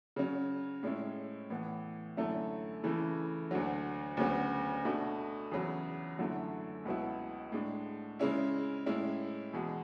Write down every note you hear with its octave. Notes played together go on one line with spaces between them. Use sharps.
C#3 F#3 C#4
A2 G#3 C#4 E4
A2 E3 B3
F#2 D3 A3 C#4 E4
C#3 E3 A3 E4
D2 D3 F#3
D2 C#3 F#3 B3
B2 A3 D4
E2 C#3 F#3
F#2 D3 F#3 A3 E4
C#2 B2 F#3 B3 E4
A2 G#3 D4
C#3 G#3 C#4 E4
A2 G#3 C#4 E4
E2 B2 G#3